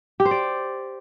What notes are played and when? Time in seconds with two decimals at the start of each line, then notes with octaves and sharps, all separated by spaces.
0.20 G4
0.25 C5
0.31 D5